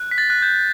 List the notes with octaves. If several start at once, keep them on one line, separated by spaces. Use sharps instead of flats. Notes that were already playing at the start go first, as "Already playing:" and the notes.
Already playing: F#6
B6
A6
F#6
G6